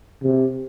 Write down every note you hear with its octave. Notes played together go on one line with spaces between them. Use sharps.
C3